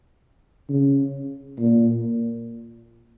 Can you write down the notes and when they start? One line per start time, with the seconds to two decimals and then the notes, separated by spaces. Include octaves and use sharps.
0.69 C#3
1.59 A#2